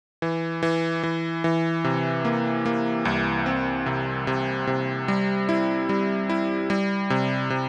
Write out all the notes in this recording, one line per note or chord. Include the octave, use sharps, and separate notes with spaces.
E3
E3
E3
E3
C3
A#3
A#3
C2
C4
C3
C3
C3
G3
E4
G3
E4
G3
C3
C3